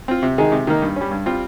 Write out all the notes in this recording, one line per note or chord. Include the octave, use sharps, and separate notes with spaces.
C4 F4
C3
D#3 G#3 D#4 G#4
C3
D#3 A#3 D#4
G2
G3 C#4
G2
G3 C4 F4